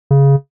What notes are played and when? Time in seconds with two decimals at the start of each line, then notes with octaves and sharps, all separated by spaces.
0.11 C#3